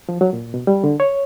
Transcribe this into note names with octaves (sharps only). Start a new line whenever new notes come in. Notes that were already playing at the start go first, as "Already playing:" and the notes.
F3
F#3
A#2
B2
G3
D3
C#5